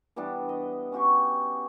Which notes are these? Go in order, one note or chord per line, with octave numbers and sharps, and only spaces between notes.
E3 G3 B3 D4
D#5
C#4 F#4 G4 C#6